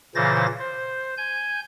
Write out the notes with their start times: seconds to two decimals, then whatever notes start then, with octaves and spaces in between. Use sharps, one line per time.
0.15 A#2 C#3 E3 C5 A6 A#6
0.59 C5
1.18 G#5 G6